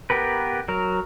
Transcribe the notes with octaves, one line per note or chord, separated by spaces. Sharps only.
B3 G4 A#4 B4
F#3 A#4